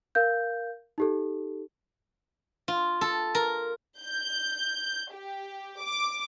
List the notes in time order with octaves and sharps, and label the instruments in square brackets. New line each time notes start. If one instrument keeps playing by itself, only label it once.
[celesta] A#4 F5 G6
D#4 G4 A4
[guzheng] F4
A4
A#4
[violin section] G6
G4
D6